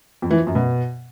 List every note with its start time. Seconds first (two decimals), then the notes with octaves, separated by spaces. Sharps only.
0.22 F2
0.31 E3
0.39 F3
0.47 F#2
0.55 B2